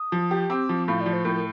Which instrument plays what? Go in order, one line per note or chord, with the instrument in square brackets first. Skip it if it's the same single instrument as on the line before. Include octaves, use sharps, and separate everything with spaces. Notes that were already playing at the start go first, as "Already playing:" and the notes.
Already playing: [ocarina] D#6
[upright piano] F3
G4
[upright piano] C4 [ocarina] D6
[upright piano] F3
[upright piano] A2 [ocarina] F5
[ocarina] D5
[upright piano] F3
[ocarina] C5
[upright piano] A2 [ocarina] A#4
[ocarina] A#4